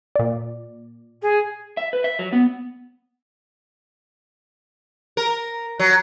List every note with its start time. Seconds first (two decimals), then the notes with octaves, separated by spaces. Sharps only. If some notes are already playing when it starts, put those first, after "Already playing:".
0.16 A#2 D5
1.21 G#4
1.77 E5
1.93 B4
2.04 E5
2.19 F#3
2.33 B3
5.17 A#4
5.79 F#3